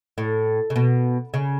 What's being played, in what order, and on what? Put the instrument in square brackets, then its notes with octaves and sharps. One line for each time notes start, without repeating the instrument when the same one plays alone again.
[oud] A2
C#3
B2
C#3